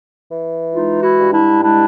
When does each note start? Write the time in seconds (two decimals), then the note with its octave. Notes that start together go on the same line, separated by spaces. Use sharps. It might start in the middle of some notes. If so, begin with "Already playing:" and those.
0.28 E3
0.73 G#3 D#4 F4
1.02 E4 F#4
1.18 G2
1.33 D4 E4
1.62 G#3 D4 E4